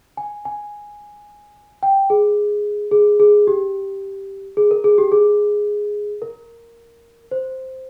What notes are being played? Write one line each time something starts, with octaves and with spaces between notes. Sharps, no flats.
G#5
G#5
G5
G#4
G#4
G#4
G4
G#4
A#4
G#4
G4
G#4
A#4
C5